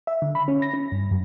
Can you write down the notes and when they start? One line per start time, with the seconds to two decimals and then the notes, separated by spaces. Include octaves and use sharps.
0.07 E5
0.22 D3
0.35 B5
0.48 C#4
0.62 A#6
0.74 C#4
0.92 G2
1.11 F#2